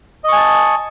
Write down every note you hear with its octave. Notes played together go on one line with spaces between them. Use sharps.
D#5 G#5 A5 C#6